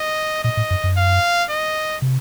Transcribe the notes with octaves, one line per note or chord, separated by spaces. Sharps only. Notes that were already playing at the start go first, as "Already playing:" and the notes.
Already playing: D#5
A#2 D#5
A2
F#2
F#2
F5
D#5
C3